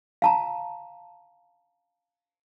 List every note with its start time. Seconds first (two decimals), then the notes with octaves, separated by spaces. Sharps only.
0.22 F5 A5 A#5